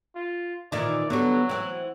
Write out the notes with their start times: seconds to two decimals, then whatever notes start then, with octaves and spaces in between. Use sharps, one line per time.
0.15 F4
0.72 A#2 D#3 E3 D5
1.10 D3 F#3 G3 B3
1.49 E3 C4 F#5